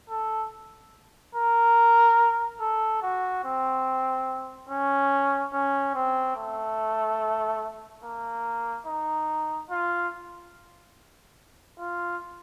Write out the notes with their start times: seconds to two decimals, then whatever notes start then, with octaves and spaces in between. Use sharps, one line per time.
0.09 A4
1.35 A#4
2.60 A4
3.02 F#4
3.44 C4
4.69 C#4
5.53 C#4
5.95 C4
6.36 A3
8.04 A#3
8.86 D#4
9.70 F4
11.79 F4